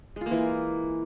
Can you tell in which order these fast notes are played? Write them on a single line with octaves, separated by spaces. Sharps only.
G#3 F4 A#3 E3